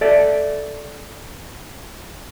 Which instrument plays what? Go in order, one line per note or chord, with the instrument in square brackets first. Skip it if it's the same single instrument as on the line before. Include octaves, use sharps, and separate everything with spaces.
[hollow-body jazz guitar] A4 D5 E5